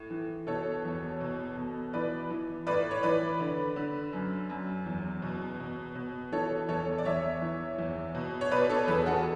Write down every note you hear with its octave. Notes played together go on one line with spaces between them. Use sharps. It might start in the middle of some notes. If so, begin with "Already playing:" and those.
Already playing: A2
E3
B2 A4 C#5
E2
B2
B2
E3 B4 D5
E3
A2 B4 D5
C#5
E3 B4 D5
D3
D3
F#2
F#2
E2
B2
B2
B2
E3 A4 C#5
E2 A4 C#5
D5
E2 C#5 E5
E3
E2
B2
C#5
B2 B4 D5
A4 C#5
E2 G#4 B4
F#4 A4